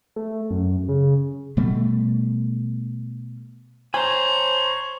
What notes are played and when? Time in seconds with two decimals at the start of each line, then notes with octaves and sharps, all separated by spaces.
0.16 A3
0.51 F#2
0.89 C#3
1.57 B2 G3 A3
3.94 C5 C#5 G#5 A#5 B5